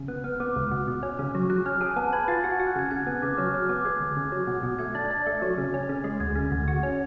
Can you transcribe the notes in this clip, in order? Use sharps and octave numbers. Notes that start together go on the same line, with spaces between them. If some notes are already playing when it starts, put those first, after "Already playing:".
Already playing: C#3
B3 F#6
B3 F6
B3 D6
C#2 F6
B2
B2
C#4
C#3
F#3
F#3 F#6
C#4 F6
G#4 G#5
B3 A5
B4 G#6
F4 A6
F#4
F#4
F#6
C#3 G#6
C#3 G#6
B3 F#6
C#3 D6
F#3 F6
F#3 F6
B3 D6
G#3 G#6
D2
C#3
F#3
B2
B2
A3 G#6
D4 A6
D4 A6
A3
F#3
C#3
C#4
C#3
G#3
D2 G#6
C#3
D2
F#4
C#4